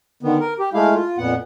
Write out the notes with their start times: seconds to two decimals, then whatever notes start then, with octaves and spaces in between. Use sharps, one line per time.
0.23 D3 D#3 B3
0.40 A#4
0.60 G4
0.74 G#3 A3 E4 F5
0.94 F4
1.18 F2 A#2 B3 F#5